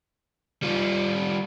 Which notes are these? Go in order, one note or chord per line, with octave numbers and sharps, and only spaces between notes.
G3 F4